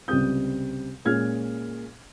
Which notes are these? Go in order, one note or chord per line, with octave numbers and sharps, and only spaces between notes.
C#2 C3 G3 C4 D#6 G6
A#2 G#3 C#4 F6 G#6